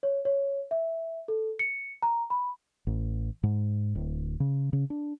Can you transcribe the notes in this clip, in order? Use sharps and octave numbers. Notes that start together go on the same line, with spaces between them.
C#5
C#5
E5
A4
C#7
A#5
B5
A1
G#2
D1
C#3
C#3
D4